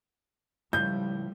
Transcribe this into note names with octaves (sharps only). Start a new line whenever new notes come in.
C#2 A2 F3 G3 A3 G6